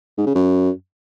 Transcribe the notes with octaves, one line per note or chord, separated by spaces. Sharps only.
G#2
C#3
F#2